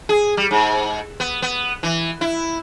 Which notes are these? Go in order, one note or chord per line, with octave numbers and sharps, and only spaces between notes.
G#4
G3
G#2
B3
B3
E3
E4